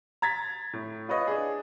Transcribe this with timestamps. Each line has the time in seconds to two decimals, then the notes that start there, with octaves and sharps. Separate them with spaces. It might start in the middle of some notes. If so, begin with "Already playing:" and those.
0.22 A#5 G#6 A6 B6
0.73 A2
1.09 F4 B4 C#5 D#5
1.27 D4 G#4